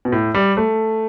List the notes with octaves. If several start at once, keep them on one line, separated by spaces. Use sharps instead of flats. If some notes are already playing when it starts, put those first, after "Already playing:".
B2
A2
G3
A3